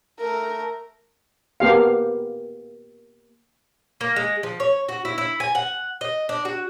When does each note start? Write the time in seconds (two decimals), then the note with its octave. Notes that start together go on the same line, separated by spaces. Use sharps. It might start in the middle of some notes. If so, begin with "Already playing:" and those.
0.19 A3 A#4
1.60 A#3 B3 G4 F5
4.01 A#3
4.16 G#3
4.43 F3
4.60 C#5
4.89 F#4
5.05 E4
5.18 E4
5.40 G#5
5.55 F#5
6.01 D#5
6.29 D4
6.45 F#4